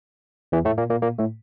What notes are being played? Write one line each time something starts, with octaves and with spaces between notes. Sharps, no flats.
E2 E3
A2 A3
A#2 A#3
A#2 A#3
A#2 A#3
A2 A3